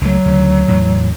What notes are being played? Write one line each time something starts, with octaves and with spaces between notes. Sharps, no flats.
C#2 F#3 A3
D2 C#3
E2 A2